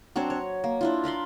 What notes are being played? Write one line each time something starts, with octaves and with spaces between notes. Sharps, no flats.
F#3 C4 D4 C#5
C#5
A#3
D4 E4 F4
A#4 F5 B5 C6